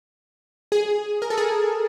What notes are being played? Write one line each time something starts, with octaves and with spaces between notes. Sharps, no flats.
G#4
A#4
A4
G#4